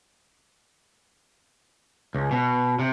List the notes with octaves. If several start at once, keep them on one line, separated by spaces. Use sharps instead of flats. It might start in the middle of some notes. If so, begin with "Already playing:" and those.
C#2
B2
C3